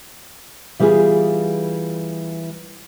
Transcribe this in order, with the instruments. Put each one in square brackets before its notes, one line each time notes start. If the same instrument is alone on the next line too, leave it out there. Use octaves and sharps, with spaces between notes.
[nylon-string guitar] E3 G3 B3 F4 G#4